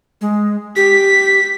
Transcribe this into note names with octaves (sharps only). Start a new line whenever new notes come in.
G#3
G4 B6